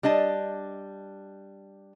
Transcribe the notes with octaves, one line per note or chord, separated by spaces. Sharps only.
G3 D4 D#5 A5